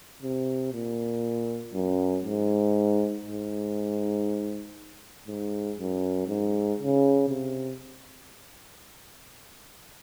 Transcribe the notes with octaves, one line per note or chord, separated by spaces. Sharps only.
C3
A#2
F#2
G#2
G#2
G#2
F#2
G#2
C#3
C3